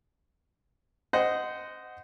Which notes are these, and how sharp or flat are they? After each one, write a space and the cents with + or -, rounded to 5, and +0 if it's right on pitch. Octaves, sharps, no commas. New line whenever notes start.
C5 -20 D#5 +0 F#5 +0